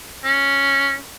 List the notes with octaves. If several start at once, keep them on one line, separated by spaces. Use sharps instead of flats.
C#4